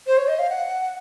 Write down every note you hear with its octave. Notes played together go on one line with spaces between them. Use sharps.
C5
C#5
D#5
F5
F#5